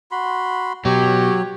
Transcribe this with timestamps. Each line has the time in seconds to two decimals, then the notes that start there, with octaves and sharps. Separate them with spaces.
0.11 F#4 B5 C6
0.85 B2 F#3 G4 C#5